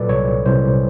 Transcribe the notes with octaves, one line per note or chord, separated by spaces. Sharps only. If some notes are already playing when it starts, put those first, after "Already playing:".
Already playing: A#2 F#3 A4 B4 D5
C2 C#5
C2 C5